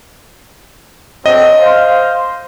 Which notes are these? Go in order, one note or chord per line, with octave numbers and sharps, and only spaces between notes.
D3 F#3 C4 D#5
C5 F5